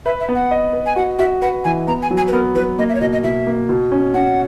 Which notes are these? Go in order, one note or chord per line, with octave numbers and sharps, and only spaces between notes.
B4 E5
E5
B3
F#5
D#5
B4
G#5
F#4 F#5
F#4 E5
B4 F#5
E3 G#5
B3 A#5
G#5
F#3
G#5
B4
B3 A#4
F#3 B4
A#3 D#5
E5
C#5
B2 D#5
D#5
B2 E5
A#3
B2
C#4
C#4 F#5